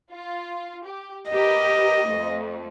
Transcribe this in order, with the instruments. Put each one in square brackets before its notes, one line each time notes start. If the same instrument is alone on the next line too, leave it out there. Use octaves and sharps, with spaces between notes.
[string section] F4
G4
[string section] G4 A#4 B4 [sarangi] D#5
[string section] F2 A3